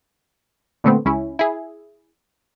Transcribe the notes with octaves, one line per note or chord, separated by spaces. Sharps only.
A#2 D3 A3 B3 C4
C#2 C#4 E4
E4 G#4